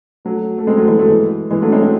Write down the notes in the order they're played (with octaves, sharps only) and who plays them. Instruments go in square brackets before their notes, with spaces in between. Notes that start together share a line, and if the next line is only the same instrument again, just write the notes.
[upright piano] F#3 A3
A3
G#3 C4
F#3 A3
E3 G#3
F#3 A3
E3 G#3
E3 G#3
F#3 A3
C#4
G#3 C4
G#3 C4